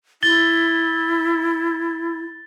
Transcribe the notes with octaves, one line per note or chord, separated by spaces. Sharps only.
E4 A6 G7